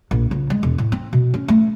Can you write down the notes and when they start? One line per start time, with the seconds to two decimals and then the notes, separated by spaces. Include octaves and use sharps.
0.11 A#1
0.31 C#2
0.50 G#3
0.63 E1
0.78 A2
0.92 C4
1.13 B2
1.34 C#4
1.48 A3